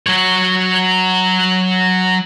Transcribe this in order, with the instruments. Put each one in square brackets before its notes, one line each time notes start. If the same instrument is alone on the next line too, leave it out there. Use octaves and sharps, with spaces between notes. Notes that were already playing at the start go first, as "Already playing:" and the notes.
[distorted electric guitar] F#3 C#5